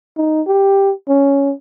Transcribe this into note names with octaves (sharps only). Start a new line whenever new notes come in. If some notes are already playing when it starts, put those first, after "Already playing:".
D#4
G4
C#4